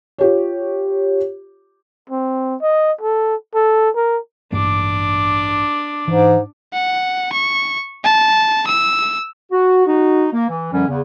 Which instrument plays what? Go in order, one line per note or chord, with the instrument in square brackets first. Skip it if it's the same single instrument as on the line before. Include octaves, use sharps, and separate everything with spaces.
[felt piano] F4 G4 C#5
[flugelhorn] C4
D#5
A4
A4
A#4
[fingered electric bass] A1 G2 A#3 [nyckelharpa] D4 D6
[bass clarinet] G#2 [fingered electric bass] E3
[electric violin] F#5
C#6
A5
E6
[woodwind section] F#4
D#4 F#4
A#3
E3
F#2 D3 F3 G3 C#4
E2 C#3